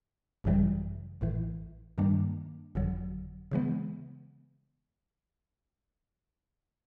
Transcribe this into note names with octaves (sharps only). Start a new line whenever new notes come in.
G#1 F#2 C#3 E3 G3
A1 A2 E3
G2 D#3 G3 A#3 D4
G1 F2 D3 F#3
C#3 E3 G#3 B3